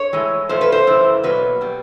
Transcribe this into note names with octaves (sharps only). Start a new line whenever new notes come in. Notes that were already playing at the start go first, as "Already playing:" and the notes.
Already playing: C#5
A2 E3 G#3
A#2 F3 A3 C5
B4
C5
F#2 C#3 E3 A3
B2 F#3 A#3 B4
B2 G3